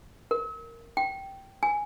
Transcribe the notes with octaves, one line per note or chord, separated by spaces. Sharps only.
A#4
G5
G#5